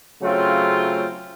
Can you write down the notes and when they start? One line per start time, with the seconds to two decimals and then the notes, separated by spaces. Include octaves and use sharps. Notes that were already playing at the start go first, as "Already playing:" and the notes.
0.22 C#3 F#3 A3 C4 F4